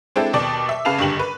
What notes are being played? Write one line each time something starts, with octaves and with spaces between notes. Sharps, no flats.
G#3 C4 D4 E4 A4
D#2 B2 D5 A5 D6
E5
C#3 B4 F5 A5 F7
F#1 G2 D3 G4 F#7
B4